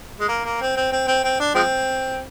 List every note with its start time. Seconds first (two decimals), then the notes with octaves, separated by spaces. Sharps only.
0.20 G#3
0.29 A#3
0.45 A#3
0.61 C4
0.76 C4
0.92 C4
1.07 C4
1.24 C4
1.40 D4
1.55 F3 G#3 C4